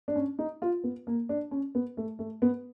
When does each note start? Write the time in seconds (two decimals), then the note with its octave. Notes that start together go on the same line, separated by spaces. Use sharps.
0.08 D4
0.16 C#4
0.39 D#4
0.62 F4
0.84 B3
1.07 A#3
1.29 D4
1.51 C#4
1.75 B3
1.97 A3
2.19 A3
2.42 B3